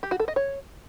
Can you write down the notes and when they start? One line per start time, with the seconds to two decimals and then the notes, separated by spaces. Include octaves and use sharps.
0.03 G4
0.11 F#4
0.20 A4
0.28 D#5
0.36 C#5